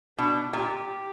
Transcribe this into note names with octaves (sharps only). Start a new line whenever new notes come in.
B2 D4
A#2 G4